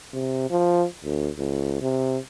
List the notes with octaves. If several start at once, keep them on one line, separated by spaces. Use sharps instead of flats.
C3
F3
D2
C#2
C3